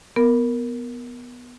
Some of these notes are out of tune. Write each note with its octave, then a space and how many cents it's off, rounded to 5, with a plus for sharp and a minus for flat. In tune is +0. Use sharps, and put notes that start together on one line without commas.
B3 +0 A#4 +0